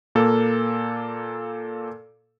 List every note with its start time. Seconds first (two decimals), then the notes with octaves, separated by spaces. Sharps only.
0.15 A#2 A#3 A4